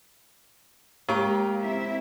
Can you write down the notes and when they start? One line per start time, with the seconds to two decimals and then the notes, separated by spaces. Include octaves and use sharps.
1.09 G#3 A#3 G4 F5 A#5 C#6
1.61 C4 E4 E5